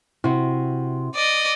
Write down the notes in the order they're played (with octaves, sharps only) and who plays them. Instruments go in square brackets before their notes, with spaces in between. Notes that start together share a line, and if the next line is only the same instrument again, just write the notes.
[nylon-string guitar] C3 F#4 [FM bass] E4
[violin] D5 D#5